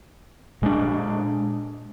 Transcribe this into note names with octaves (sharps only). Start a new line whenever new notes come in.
A#2 G#3 D4